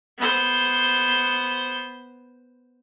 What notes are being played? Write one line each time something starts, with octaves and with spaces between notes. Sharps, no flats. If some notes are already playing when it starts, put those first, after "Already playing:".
B3 C5